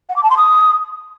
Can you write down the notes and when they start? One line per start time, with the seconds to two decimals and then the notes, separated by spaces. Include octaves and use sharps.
0.08 F#5
0.15 D6
0.23 A5
0.30 C6
0.37 D#6